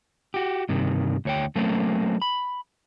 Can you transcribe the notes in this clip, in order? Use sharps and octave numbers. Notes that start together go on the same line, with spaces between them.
F#4 G4
G2 C3 D#3
D2 C#5 G5
F#3 A3 A#3 C4 C#4
B5